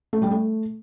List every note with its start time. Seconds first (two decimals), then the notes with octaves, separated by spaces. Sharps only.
0.13 A3
0.22 G3
0.31 A3